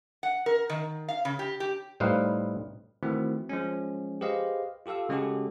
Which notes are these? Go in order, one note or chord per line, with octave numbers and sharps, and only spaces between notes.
F#5
A#4
D#3
F5
C#3
G4
G4
A2 G3 D#4 B4 C5 F5
D#3 E3 A3 C4 E4 F#4
F3 G#3 C#4
G4 G#4 B4 C5 D#5 F5
F4 G4 A4 F5 E6
C#3 G#3 C#4 F#4 G4 A4